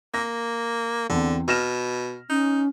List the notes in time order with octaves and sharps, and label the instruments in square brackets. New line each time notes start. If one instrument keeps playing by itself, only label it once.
[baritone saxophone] A#3 [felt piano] A#6
[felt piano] E2 C4 [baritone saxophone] D3
[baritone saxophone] B2 [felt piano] F6 A#6 E7
[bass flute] C#4 [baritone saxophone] D#4